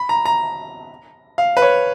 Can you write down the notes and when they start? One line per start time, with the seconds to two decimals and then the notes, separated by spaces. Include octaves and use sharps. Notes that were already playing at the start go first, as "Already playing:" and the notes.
Already playing: B5
0.09 A#5
0.25 A#5
1.38 F5
1.57 B4
1.62 C#5